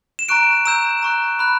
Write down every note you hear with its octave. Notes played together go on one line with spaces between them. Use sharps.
E7
A#5 C#6 F#6 D7
A#5 E6 G6 E7
A#5 C#6 F#6
B5 F#6